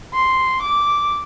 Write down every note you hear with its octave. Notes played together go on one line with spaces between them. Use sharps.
C6
D6